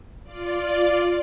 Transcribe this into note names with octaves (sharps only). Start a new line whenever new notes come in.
F4 D5